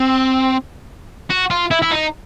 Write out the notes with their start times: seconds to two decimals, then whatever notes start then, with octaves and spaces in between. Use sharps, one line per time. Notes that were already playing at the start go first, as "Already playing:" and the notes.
Already playing: C4
1.30 F#4
1.50 F4
1.71 E4
1.82 E4
1.91 D#4